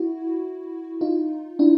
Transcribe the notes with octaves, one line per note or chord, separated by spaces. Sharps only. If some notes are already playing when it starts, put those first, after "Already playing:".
Already playing: E4 F#4
D#4 F4
D4 E4